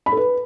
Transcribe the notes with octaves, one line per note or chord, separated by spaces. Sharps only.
B5
A4
B4